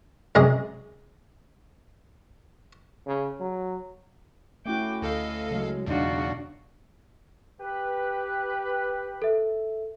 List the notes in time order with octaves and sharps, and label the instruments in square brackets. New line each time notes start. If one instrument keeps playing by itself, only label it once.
[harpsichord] F#2 C3 G#3 G#4 A#5
[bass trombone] C#3
F#3
[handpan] A3 C#4 E4 [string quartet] F#4 G5 D6
[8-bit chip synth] D2 A4 F5 [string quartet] D#5
[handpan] C#3 F#3 [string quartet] G#3
[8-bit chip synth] E2 B2 [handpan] F#3 D#4 [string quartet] D4 F4 F#4
[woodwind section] G4 B4
[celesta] A4 E5